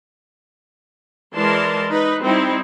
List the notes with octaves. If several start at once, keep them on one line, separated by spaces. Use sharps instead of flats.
E3 G#3 A#4 D5 A5 C6
D#4 B4
G3 C4 D#4 E4